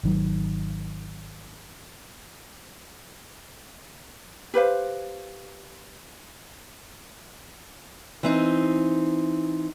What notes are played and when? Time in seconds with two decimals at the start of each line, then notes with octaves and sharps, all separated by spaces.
0.03 G#1 D#3 F#3
4.54 G4 B4 C5 F5
8.23 E3 C4 D#4